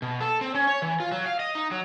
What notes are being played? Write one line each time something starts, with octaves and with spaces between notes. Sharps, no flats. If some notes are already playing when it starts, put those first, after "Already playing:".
B2
A4
C4
C#4
C#5
E3
F4
F#3
F5
D#5
D#4
F#3